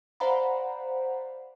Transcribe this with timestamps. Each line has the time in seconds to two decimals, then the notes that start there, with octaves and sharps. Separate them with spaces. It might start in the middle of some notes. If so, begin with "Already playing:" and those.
0.20 C5 D5 F5 F#5 A#5 B5